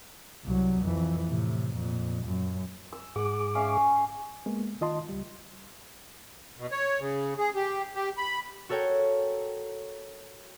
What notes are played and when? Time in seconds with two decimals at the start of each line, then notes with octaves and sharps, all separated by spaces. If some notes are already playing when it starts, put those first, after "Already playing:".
0.45 C2 F#3
0.81 F2 E3
1.28 A2 C3
1.74 F2 A#2
2.26 F#2
2.93 E6
3.16 G#2 G#4 F#5 D6
3.55 C#4 E5 F5
4.46 G#3 A#3 B3
4.81 D#3 F4 D#5 A5 C6
5.09 C#2 G3
6.59 B2
6.72 C#5
7.00 C#3
7.38 G#4
7.55 G4
7.95 G4
8.18 B5
8.69 F#4 A4 A#4 C#5 G5